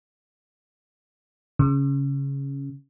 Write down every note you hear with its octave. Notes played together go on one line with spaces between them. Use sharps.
C#3